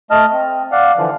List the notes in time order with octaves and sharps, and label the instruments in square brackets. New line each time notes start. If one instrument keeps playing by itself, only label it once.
[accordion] A3 D#5 A5 F6
C4
D5 F5 F#5
D3 E3 F3